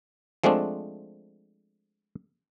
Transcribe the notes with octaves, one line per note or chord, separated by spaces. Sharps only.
F3 G#3 A3 C4 D4